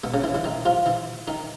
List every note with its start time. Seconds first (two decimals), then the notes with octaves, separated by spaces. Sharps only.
0.04 B2 B3
0.14 C#3 C#4
0.24 E3 E4
0.35 E3 E4
0.44 D#3 D#4
0.65 F3 F4
0.86 E3 E4
1.27 D#3 D#4